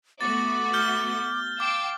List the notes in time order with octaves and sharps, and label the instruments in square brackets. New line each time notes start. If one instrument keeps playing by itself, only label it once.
[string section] A3 B3 F#4 [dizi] D6 [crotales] A6
[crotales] F6 G6 G7
[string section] F5 G5 E6 [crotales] D6